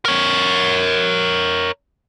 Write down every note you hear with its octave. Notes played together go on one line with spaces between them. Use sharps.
A#4 C#5